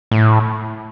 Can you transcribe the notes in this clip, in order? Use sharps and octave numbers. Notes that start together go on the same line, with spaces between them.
A2